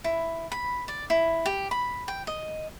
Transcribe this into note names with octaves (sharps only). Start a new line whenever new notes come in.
E4
B5
D5
E4
G4
B5
G5
D#5